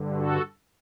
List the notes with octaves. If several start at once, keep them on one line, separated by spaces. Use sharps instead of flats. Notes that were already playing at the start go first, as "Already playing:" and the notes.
Already playing: G2 D3
F#4 A4